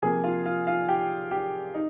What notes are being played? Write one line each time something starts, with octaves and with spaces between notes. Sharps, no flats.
C3 F3 A#3 G#4 G#5
F4 F5
F4 F5
F4 F5
G4 G5
G4 G5
D#4